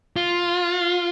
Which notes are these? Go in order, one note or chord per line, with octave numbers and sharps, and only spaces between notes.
F4